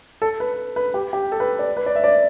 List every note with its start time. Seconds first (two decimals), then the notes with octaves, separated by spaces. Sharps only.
0.22 A4
0.40 B4
0.76 B4
0.94 G4
1.13 G4
1.32 A4
1.40 B4
1.59 D5
1.77 B4
1.86 D5
1.95 E5
2.04 D5